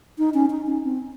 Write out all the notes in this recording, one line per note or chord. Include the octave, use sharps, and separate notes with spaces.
D#4
C#4
D#4
C#4
C4